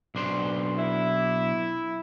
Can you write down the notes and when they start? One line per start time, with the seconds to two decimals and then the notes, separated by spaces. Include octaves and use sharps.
0.15 B1 D4 C5
0.77 E4